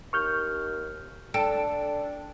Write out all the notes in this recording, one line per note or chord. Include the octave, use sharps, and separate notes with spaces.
D#2 C#6 F6 G6
D4 A4 G5 D7